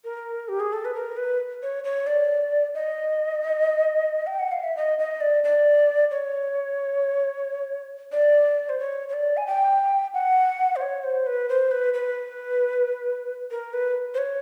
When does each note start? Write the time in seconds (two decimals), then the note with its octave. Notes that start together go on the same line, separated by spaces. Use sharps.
0.04 A#4
0.49 G4
0.60 G#4
0.73 A4
0.85 B4
0.94 A#4
1.17 B4
1.62 C#5
1.84 C#5
2.07 D5
2.75 D#5
4.27 G5
4.39 F#5
4.52 F5
4.63 E5
4.77 D#5
4.99 D#5
5.21 D5
5.44 D5
6.11 C#5
8.12 D5
8.69 C5
8.79 C#5
9.09 C#5
9.13 D5
9.37 G#5
9.47 G5
10.14 F#5
10.76 C5
10.81 C#5
11.04 C5
11.26 B4
11.49 C5
11.71 B4
11.94 B4
13.51 A#4
13.73 B4
14.14 C5
14.18 C#5